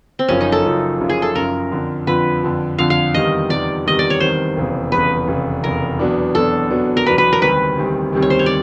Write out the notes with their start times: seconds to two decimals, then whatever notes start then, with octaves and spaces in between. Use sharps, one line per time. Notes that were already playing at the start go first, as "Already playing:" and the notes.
0.19 C4
0.28 F#1 F#2 C#3 F3 C#4
0.41 D#4
0.52 A4
0.65 F#1 F#2 C#3 F3
1.00 F#1 F#2 C#3 F3
1.09 G#4
1.22 A4
1.35 F#1 F#2 C#3 F3 A#4
1.72 F2 D3 F3
2.07 F2 D3 F3 B4
2.43 F2 D3 F3
2.78 F2 D3 F3 F5
2.90 F5
3.14 E2 C3 D#3 G3 D#5
3.49 E2 C3 D#3 G3 D5
3.86 E2 C3 D#3 G3 D#5
3.99 D5
4.10 C#5
4.20 E2 C3 D#3 G3 C5
4.56 F1 E2 C#3
4.92 F1 E2 C#3 B4
5.28 F1 E2 C#3
5.64 F1 E2 C#3 A#4
5.99 E2 B2 F#3 B3 D4
6.35 E2 B2 F#3 B3 D4 A4
6.70 E2 B2 F#3 B3 D4
6.97 A#4
7.06 E2 B2 F#3 B3 D4 B4
7.18 B4
7.33 A#4
7.41 D2 C3 D#3 G3 C4 B4
7.77 D2 C3 D#3 G3 C4
8.12 D2 C3 D#3 G3 C4
8.22 C#5
8.30 C5
8.39 C#5
8.46 D5